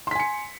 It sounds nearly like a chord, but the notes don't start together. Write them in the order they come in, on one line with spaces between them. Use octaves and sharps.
C6 B6 G#5 C#7